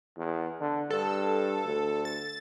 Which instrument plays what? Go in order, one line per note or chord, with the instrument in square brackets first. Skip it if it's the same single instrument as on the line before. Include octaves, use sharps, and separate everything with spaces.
[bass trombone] E2
D3
[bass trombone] G2 [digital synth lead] A4
[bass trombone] D2
[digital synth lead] A6